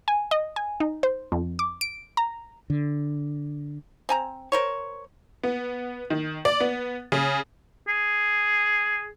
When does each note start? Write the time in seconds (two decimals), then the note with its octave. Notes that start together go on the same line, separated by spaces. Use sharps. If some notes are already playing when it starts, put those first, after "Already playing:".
0.08 G#5
0.31 D#5
0.56 G#5
0.80 D#4
1.03 C5
1.32 F2
1.59 D6
1.81 D7
2.17 A#5
2.70 D3
4.09 C4 G#5 A#5
4.52 A#4 C5 C#5
5.43 B3
6.10 D#3
6.45 D5
6.60 B3
7.12 C#3
7.88 G#4